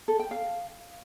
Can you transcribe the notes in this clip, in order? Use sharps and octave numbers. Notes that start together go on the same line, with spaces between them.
A4
G5
F5